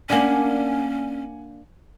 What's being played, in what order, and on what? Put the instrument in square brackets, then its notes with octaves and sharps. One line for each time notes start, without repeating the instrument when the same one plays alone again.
[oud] A#3 D4 [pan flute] C#4 [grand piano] F#5 G#5 F#7